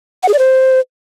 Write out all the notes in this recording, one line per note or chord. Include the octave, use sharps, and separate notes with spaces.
F#5
G#4
D5
C5